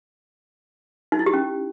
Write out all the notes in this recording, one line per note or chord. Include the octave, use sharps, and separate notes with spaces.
D#4
E4
G4
C#4